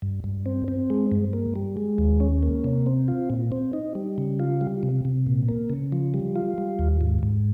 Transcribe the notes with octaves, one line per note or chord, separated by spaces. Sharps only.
G2
G2
C4
C4
G#3
G2
A#3
G3
G#3
D#2
C#4
A#3
C3
C4
F4
A#2
C4
D#4
G3
C#3
F4
G3
C3
C3
A#2
A#3
C#3
F3
G3
F4
G3
D#2
G#2
G#2